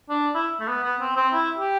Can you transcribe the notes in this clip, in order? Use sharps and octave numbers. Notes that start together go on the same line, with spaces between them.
D4
E4
A3
B3
B3
C4
C4
E4
G4